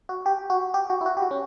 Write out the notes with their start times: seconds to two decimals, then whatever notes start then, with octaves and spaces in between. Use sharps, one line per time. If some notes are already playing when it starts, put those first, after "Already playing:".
0.09 F#4
0.26 G4
0.50 F#4
0.74 G4
0.90 F#4
1.01 E4
1.06 F#4
1.17 G4
1.22 F#4
1.31 C#4